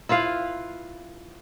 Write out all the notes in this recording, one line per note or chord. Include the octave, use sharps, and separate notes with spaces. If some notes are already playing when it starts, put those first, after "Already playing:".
E4 F4 B4 F5